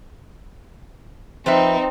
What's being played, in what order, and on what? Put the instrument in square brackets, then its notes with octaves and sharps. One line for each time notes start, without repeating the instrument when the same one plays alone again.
[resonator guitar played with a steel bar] F3 B4 E5 [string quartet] C4 D#4